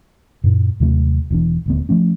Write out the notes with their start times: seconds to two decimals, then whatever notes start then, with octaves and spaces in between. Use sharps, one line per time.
0.44 F#2 A#2
0.80 D#2 C3 F#3 A3
1.30 E1 E2 D4
1.66 D#1 D2 B3
1.89 F3 A3 C#4